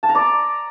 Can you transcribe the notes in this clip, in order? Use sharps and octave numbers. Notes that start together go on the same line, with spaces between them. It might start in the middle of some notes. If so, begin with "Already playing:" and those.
A5
A#5
D5